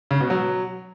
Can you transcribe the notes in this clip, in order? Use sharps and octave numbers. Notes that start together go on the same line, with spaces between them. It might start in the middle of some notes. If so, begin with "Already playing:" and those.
C#3
B2
F#3